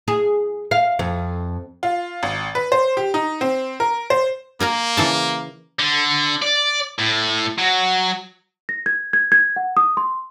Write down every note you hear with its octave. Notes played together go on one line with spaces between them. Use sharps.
G#4
F5
F2
F4
G#1
B4
C5
G4
D#4
C4
A#4
C5
A#3 A#4 G#5 A#5
C#3 E3 A5
D3
D5
A2
F#3
A#6
G#6
G#6
G#6
F#5
D#6
C6